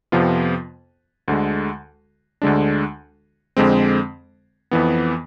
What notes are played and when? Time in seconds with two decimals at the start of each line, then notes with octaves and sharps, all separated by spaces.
0.12 F2 C3 F3 B3 F4
1.28 D2 D3 G#3
2.42 D2 D3 G#3 D4
3.57 F2 D3 G#3 C4
4.71 F2 E3 B3